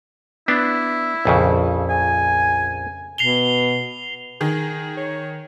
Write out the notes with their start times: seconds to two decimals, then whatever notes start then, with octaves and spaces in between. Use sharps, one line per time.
0.48 B3 D4 E4
1.25 A#1 F2 C#3
1.90 G#5
3.18 B2 C7 F7 G7
4.41 D#3 G#4
4.97 C#5